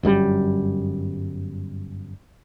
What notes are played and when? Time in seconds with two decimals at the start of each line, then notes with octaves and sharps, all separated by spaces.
0.03 G1 F#2 C3 G3